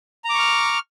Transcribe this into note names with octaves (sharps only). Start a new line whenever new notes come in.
A#5 C#6 D6 F6